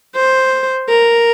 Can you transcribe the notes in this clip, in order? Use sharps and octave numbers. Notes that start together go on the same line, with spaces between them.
C5
A#4